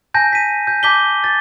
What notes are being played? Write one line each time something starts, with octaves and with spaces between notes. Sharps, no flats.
G#5 A5 G6 A#6
B6 D#7
G6
A5 D6 G6 B6 G7
A6